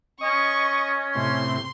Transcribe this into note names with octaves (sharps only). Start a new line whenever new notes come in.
C#4 D#5 C#6 D#6
A2 C3 C6